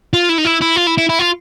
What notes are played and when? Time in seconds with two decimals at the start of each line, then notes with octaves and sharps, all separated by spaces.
0.13 F4
0.29 E4
0.38 D#4
0.45 E4
0.62 E4
0.76 F4
0.87 E4
0.98 E4
1.09 E4
1.19 F4